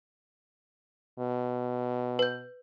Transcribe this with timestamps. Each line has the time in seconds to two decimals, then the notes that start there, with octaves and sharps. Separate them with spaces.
1.19 B2
2.19 B4 G6